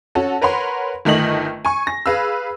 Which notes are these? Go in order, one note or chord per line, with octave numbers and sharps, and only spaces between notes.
C#4 F#4 A4
A#4 B4 C#5 F#5 C6
G1 D#3 A3 D#5 F#7
G#5 C#6
A#6
G#4 B4 F5 E6